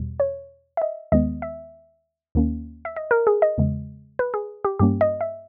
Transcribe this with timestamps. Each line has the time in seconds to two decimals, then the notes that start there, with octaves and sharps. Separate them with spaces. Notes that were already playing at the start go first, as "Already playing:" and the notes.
Already playing: E2 B2 G3
0.20 C#5
0.77 E5
0.82 D#5
1.12 D#2 D#3 G#3 B3 D#5
1.42 E5
2.35 D#2 D#3 A#3 C#4
2.85 E5
2.96 D#5
3.11 A#4
3.27 G#4
3.42 D#5
3.58 E2 C#3 G#3
4.19 B4
4.34 G#4
4.65 G4
4.79 G2 G3 A#3 C#4 G4
5.01 D#5
5.21 E5